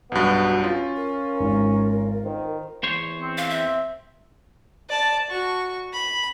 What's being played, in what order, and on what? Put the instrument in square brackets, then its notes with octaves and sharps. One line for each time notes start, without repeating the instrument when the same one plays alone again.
[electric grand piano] B1 G2 [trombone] B3 [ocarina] F#4
[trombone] C#4 [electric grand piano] F4
[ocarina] A#4
[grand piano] G#1
[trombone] D#3 [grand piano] C5
[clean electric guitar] E2 C5 C#5
[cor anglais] C4
[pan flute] F5
E5
[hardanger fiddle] D5 A5
F#4 C#6
B5